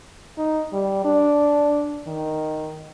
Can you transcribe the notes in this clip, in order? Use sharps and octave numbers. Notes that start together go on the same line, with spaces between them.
D#4
G3
D4
D#3